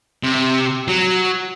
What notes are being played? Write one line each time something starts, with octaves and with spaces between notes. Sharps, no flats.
C3
F#3